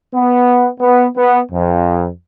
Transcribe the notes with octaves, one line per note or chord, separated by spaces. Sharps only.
B3
B3
B3
F2